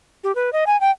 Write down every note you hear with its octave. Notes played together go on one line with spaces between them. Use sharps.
G4
B4
D#5
G#5
G5